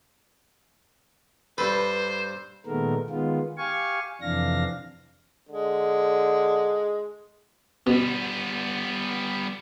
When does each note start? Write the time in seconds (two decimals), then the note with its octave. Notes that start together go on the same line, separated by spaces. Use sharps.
1.58 G2 A4 B4 C5
2.66 A#2 D#3 G#3 A3 B3 A#4
3.10 D#3 G#3 B3 F4
3.58 G4 F5 G#5 C#6
4.21 F2 C3 E3 D4 F5 A#6
5.49 D3 G#3
7.87 B2 G3 B3